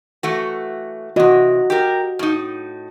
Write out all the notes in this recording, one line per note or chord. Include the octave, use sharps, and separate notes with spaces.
E3 A3 F#4
C3 E3 F#4 D#5
G4 A#4
A2 D#4